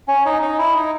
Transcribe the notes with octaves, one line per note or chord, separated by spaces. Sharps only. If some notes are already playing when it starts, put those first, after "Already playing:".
C#4
D#4
D#4
E4
D#4